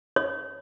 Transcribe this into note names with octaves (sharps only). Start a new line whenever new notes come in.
C#5